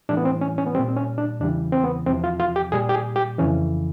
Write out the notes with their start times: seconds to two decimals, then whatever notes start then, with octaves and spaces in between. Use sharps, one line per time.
0.09 A2 E3 G3 D4
0.17 B3
0.25 C4
0.41 C#4
0.58 C#4
0.67 B3
0.75 G3 C4
0.79 A#2
0.89 C4
0.97 C#4
1.18 D4
1.40 E2 C#3 E3 G3 D4
1.72 C4
1.84 B3
2.06 E2 C4
2.09 C3 F3
2.24 F4
2.40 F4
2.56 G4
2.72 A#2 G3 G#4
2.89 G4
2.94 G#4
3.16 G4
3.38 F2 C#3 E3 C#4